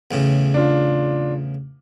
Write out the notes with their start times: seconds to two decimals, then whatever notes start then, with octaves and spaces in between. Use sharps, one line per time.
0.11 E2 A2 C#3
0.54 D4 F4